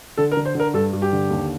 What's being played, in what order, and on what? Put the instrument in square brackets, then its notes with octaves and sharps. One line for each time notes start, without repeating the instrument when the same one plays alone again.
[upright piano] D3 A4
A#4
D3
C5
D3 A#4
G2 A4
G2
G4
D3
D#2